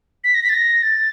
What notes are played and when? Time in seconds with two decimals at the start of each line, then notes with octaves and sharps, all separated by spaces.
0.24 B6
0.34 A#6
0.43 B6
0.49 A6
0.54 A#6
0.83 A6